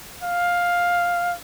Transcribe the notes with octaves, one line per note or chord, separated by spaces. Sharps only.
F5